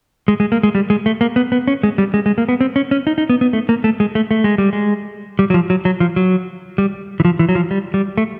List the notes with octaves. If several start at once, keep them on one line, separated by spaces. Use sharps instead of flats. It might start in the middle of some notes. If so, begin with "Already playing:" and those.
G#3
G#3
A#3
G#3
G3
G#3
A3
A#3
B3
B3
C#4
G#3
G3
G#3
G#3
A#3
B3
C4
C#4
C#4
D#4
D#4
B3
B3
A3
A#3
A3
G#3
A3
A3
G#3
G3
G#3
G3
F#3
F3
F#3
F#3
F3
F#3
G3
E3
F3
E3
F#3
F3
G3
G3
A3